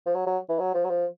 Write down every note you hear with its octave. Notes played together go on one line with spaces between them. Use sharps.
F3
F#3
F#3
E3
F#3
F3
F#3
F3